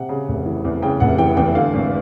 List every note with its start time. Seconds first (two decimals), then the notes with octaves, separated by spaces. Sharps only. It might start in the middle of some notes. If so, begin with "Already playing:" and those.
Already playing: C3 F#5
0.09 C#3
0.29 F1
0.46 E3
0.65 E2
0.82 C#3 G5
1.00 F1 F#5
1.18 E3 G5
1.37 E2 G5
1.55 D3 F5
1.74 G#1